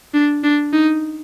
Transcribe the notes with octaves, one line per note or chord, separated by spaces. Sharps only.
D4
D4
D#4